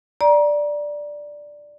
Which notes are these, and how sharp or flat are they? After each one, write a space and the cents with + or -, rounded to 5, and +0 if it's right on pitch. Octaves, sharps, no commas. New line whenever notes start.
D5 +0 A#5 +30